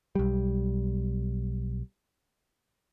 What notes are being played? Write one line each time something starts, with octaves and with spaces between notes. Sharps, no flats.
B1 G3